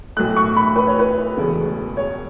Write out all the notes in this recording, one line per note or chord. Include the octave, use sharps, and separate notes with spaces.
B1 A2 A3 F#6
C#6
B5
B4
C#5
B4
E1 E2 C#3 A3
C#5